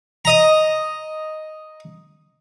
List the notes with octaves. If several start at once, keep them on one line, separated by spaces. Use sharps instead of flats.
D#5 A#5